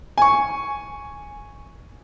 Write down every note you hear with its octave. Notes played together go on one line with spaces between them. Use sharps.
G#5 C#6